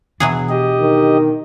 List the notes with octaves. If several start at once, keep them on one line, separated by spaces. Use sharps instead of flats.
B2 E3 F#3 B3 D4 G#4
G4 D#5
D#3